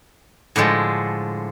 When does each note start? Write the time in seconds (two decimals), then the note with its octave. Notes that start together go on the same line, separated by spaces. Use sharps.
0.56 A2 D3 F3 G#3